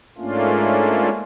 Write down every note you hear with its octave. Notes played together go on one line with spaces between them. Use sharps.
G#2 A3 A#3 C#4 D4 F4